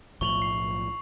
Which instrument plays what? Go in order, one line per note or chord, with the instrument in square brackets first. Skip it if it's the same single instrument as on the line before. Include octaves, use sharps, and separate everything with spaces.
[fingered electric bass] B1 A2 F3 [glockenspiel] C#6 F7 F#7
[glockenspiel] C7 F7